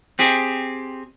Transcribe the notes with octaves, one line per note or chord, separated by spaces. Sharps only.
C4 G4 G#4